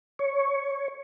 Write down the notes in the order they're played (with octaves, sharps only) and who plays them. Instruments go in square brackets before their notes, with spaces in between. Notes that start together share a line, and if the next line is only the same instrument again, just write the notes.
[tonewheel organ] C#5